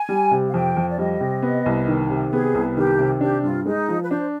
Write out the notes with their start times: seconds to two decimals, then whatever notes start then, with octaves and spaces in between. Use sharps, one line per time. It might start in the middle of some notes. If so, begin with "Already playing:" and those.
Already playing: G#5
0.09 G3
0.31 C3
0.49 F5
0.53 F2 G5
0.77 F2
0.89 D5
0.98 G3 D#5
1.20 C3
1.42 B3
1.66 C2
1.88 D#3
2.09 C3
2.32 B3 G#4
2.55 C2
2.77 D#3 G4
2.99 C3
3.21 D4 G4
3.43 G2 F4
3.66 G#3 D#4
3.88 F3
4.03 B4
4.10 D4 C5